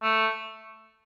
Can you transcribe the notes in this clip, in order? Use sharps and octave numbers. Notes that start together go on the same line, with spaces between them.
A3